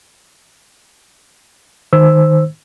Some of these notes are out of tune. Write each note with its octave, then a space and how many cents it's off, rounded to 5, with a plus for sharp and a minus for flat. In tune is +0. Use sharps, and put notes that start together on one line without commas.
D#3 +0 C5 +0 E6 +0